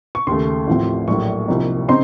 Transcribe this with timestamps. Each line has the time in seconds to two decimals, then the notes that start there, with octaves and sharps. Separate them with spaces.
0.15 C#6
0.27 D#2 C#3 A3 C6
0.67 A1 A2 F3 C4
1.08 A#1 A2 F#3 A#3 C#6
1.48 C2 C3 F3 A#3 D#4
1.88 C#3 C4 D#4 C6